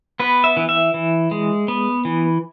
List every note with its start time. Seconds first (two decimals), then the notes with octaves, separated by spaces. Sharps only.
0.20 B3 B4
0.44 E5
0.57 E3
0.69 E5
0.94 E3
1.31 G#3
1.68 B3
2.05 E3